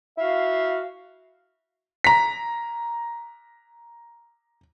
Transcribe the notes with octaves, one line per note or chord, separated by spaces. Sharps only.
E4 F#4 E5 F5
A#5 B6